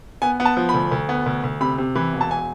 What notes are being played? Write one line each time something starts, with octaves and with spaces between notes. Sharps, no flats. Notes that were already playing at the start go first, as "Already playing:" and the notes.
B3 G#5
B3
A5
F3
B5
D2
D2
B3
D2
D2
C3 B5
C3
E3 B5
E1
A5
G#5